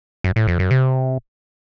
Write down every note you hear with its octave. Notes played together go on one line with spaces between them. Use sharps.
F#2
A2
F2
F#2
C3